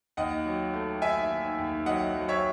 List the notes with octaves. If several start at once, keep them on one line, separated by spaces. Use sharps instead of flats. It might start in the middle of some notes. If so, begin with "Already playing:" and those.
D#2 D#5 F#5
F#3
A3
D#3 E5 G#5
D#3
D#2
F#3 D#5 F#5
F#3
C#5 E5